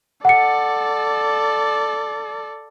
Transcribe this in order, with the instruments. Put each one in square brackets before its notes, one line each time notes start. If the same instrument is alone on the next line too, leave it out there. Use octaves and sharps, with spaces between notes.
[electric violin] A4 D5 [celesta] F#5 C#7